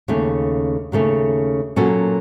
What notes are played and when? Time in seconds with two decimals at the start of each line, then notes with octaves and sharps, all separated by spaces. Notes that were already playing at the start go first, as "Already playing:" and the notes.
0.08 D#2 C#3 A3 C#4
0.92 D#2 C#3 A3 C#4
1.76 A#2 F#3 A#3 C#4 A4